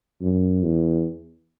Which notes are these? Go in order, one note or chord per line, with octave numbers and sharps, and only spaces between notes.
F#2
E2